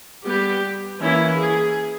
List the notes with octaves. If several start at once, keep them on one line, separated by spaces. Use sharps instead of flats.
G3 B3 G4
E3 A#3 C#4 E4
G#4